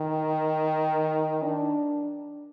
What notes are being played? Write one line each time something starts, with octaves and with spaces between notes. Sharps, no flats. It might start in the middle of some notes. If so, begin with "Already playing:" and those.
Already playing: D#3
D4